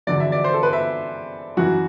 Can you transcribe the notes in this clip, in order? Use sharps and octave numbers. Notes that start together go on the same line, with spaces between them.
E2 D3 F#3 D5
E5
D5
C5
A4
B4
E5
F#2 E3 F#4